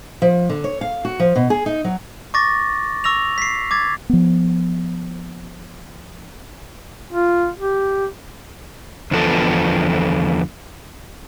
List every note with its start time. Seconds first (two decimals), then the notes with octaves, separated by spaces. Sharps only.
0.22 F3
0.49 D3
0.64 C#5
0.81 F5
1.05 F#4
1.20 F3
1.36 B2
1.50 G#4
1.66 D#4
1.84 F#3
2.34 C#6 D6 A6 A#6
3.04 C#6 E6 A#6 F7
3.38 B6 C7
3.71 D6 G#6 A6
4.09 F3 B3
7.13 F4
7.58 G4
9.11 E2 D3 F3 B3 A4